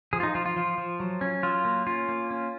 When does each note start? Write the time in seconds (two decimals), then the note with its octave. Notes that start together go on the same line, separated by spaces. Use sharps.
0.13 F3 G#4
0.20 F4
0.23 D#4
0.35 F3 F4
0.46 F4
0.56 F3
0.78 F3
1.00 F#3
1.21 C#4
1.43 F#3 F4
1.65 A#3
1.86 C#4 F4
2.09 A#3
2.31 C#4